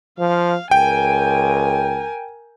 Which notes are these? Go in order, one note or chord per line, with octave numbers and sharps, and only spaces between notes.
F3 F5
C#2 A#4 G5 G#5